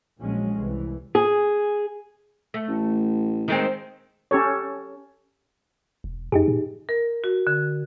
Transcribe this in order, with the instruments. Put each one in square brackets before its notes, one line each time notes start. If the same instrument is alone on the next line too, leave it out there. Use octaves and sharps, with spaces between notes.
[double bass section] A#1 F#3 G#3 C#4
C2 E3
[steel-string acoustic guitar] G#4
[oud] A3
[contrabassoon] A1
[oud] D#3 G#3 C4
[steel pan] C#4 G4 A4 C#5
[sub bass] E1
[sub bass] F#2 [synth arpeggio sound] D#4 G4 G#4
[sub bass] A#2
[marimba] A#4
F#4
D3